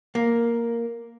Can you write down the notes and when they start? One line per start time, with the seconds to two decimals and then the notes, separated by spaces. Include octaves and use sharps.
0.15 A#3